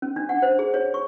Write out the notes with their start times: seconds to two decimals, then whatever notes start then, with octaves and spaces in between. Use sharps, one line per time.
0.02 C#4
0.16 D4
0.29 F#5
0.42 C5
0.59 G#4
0.74 C#5
0.94 C#6